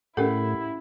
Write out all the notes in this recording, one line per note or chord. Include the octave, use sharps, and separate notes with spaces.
A2 C#4 E4 G4 A4 A#4 F#5